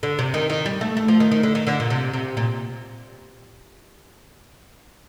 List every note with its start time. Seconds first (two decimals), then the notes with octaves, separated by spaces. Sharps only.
0.03 D3
0.19 C3
0.34 D#3
0.50 D#3
0.66 G3
0.81 A3
0.97 A3
1.08 F3
1.20 D#3
1.31 D#3
1.43 D3
1.55 D#3
1.67 D3
1.80 A#2
1.90 C3
2.13 C3
2.37 A#2